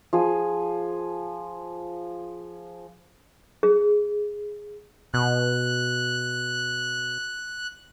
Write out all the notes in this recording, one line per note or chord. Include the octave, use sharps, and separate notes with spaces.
F3 G#4
G#4
B2 F#6